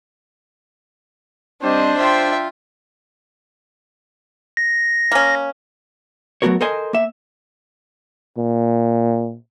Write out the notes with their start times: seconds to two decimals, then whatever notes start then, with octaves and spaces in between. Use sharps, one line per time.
1.62 G3 C4 D4 C5 D#5
1.98 F4 E5 G5
4.57 A#6
5.12 A#3 C#4
6.42 F#3 A3 B3 F#4 A#4 C#5
6.61 A4 A#4 C5 D#5 G#5
6.93 A#3 E5
8.38 A#2